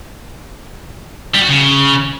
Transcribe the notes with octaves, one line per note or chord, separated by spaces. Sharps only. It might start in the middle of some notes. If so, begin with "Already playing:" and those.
G3
F#4
C#3